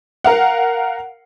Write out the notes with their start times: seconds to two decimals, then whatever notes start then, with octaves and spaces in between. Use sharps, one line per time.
0.24 A#4 F5 F#5